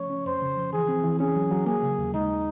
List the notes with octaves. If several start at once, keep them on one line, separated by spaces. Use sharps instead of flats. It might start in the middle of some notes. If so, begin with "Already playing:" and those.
Already playing: F3 A3 C#4 C#5
C#4
F2 C5
C#3
F3
E3 G#4
C4
E3
C#4 G#4
F#3
F#3
A#3 G#4
C#3
D#2
G#3 D#4